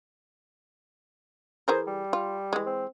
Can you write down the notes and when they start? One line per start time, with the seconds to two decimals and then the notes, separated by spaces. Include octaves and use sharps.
1.68 E3 G#4 A#4 C5
1.87 G3
2.13 F4
2.53 E3 G#3
2.66 C4